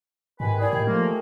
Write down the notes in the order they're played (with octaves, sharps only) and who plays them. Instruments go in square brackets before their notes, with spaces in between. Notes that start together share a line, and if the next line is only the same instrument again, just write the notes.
[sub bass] G#2 [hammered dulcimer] C3 D#3 G#3 [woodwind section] B4 [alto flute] G#5
[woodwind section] E4 G#4 [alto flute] D5
[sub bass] A2 [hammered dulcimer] A#3 [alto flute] G5
[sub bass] F3 [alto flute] A3 [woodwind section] A#3 [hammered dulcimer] F4 C#5
[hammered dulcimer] G4 G#4 E5